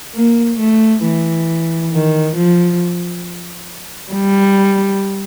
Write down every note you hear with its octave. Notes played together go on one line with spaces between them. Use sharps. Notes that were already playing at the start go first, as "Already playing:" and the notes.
A#3
A3
E3
D#3
F3
G3